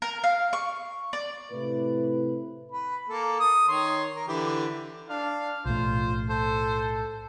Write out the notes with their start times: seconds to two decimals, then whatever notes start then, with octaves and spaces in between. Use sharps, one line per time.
0.02 A#4
0.24 F5
0.53 C#6
1.13 D5
1.51 A2 C3 E4 B4
2.71 B4
3.08 A#3 A4
3.40 D#6
3.68 D#3 C#5 C6
4.16 A#4
4.28 D3 E3 G4
5.09 D4 F5
5.66 B1 A2 F4 C5
6.30 A4 C5